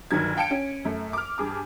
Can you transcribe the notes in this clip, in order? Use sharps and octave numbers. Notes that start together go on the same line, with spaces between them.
G1 D#3 F#3 G#6
F5 G5 A5 C#7 D7
C#4
F#2 A3
D6 F6
G2 G#4 D6